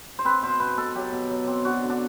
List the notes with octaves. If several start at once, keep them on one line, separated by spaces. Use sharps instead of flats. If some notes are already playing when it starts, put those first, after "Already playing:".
C5
C4 B4
B2 C5
B2 B4
B2 A4
F#3 G4
B2
F#3
C4
D4 F#4
D3
D4